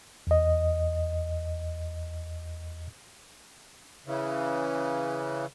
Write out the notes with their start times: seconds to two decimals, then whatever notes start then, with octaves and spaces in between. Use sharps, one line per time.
0.27 E2 D#5
4.06 C#3 E3